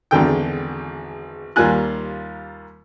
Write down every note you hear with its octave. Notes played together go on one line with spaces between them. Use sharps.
G#1 E2 D3 G5
D#2 G3 A#3 F4 G#5 F#6